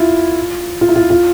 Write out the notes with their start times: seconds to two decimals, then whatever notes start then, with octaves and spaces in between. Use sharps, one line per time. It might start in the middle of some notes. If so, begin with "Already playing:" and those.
Already playing: E4 F4
0.81 F4
0.89 E4
0.96 F4
1.10 F4